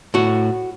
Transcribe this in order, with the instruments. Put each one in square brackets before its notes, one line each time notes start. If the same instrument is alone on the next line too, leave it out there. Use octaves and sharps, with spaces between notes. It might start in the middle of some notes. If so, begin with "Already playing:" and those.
[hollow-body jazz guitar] A2 F#4